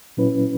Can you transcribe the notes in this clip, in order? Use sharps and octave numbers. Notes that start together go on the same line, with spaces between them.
A#2 F#3 C#4 E4 B4